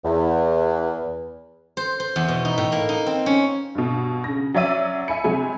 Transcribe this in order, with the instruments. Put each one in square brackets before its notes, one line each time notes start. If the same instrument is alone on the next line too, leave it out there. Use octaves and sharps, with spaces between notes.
[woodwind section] E2
[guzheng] C5
C5
E2
B2
D#4
A2
A#3
D#4
C4
C#4
[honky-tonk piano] G2 B2
C#3 A#6
F#3 C#4 D5 E5 D#7
E5 G#5 B5 C#7
C3 F#3 G#3 G#5 B5